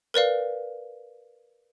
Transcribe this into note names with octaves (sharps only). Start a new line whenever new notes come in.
A#4 B4 D5 F5